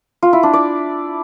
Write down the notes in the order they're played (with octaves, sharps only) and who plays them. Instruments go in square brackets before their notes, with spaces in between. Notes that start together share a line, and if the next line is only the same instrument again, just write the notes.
[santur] F4
E4
D4
D5